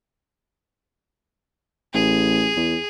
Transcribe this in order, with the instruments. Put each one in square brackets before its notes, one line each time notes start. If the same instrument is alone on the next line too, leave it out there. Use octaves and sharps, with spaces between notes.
[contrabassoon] A1 [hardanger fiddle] G#4
[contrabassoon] E2